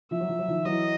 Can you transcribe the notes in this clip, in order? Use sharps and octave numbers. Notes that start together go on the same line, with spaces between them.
F3 E5
F#3
F3
F#3
D#3 F3
E3 F#3 D#5